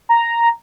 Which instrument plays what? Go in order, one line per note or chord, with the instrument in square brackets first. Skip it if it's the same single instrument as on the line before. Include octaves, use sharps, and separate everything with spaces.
[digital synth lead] A#5